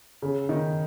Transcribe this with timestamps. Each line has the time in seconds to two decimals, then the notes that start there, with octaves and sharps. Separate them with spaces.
0.22 C#3
0.49 D#3